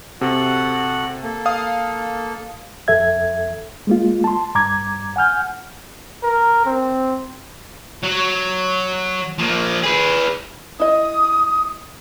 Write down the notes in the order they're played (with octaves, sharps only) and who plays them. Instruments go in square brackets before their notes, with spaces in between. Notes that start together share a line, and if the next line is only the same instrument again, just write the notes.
[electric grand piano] C3 [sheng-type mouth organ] F#4 A4 F#5
[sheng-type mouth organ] A#3 A4
[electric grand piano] F5 D#6
[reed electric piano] F2 A4 E5 G#6
G#3 A#3 F4
A5 C6
G2 A#5 D6 G#6
F#5 G#5 F6 G6
[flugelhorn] A#4
C4
[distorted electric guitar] F#3
F3 A#3
G#4 B4
[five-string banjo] E4 D#5 [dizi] D#6